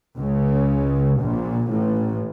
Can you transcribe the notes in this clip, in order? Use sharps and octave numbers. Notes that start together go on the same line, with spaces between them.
C#2 C#3
A#1 A#2
A1 A2